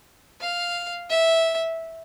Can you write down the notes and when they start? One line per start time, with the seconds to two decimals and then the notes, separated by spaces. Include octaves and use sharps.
0.41 F5
1.10 E5